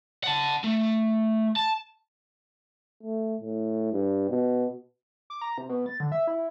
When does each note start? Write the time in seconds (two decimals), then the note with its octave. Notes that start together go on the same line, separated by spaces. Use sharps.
0.24 F#5 A5
0.64 A3
1.56 A5
3.03 A3
3.41 A2
3.93 G2
4.30 B2
5.30 D6
5.41 A#5
5.58 C3
5.69 B2
5.86 A6
6.00 D3
6.12 E5
6.27 E4